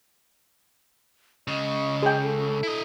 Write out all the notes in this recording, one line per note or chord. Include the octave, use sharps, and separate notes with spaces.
C#2 C#3 D#5
G#4 G5
A4
E4 D#5